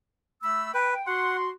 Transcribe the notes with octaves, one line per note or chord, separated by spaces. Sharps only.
A3 B5 E6
B4 G5
F#4 F#5 C6